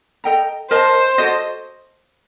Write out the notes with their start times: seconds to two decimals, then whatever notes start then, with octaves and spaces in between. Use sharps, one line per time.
0.24 A4 D#5 G5 A#5
0.71 A#4 C5 D#5 A5
1.18 F#4 A4 C5 D#5